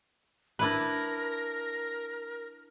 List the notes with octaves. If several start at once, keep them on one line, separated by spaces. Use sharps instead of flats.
D4 E4 A#4 B4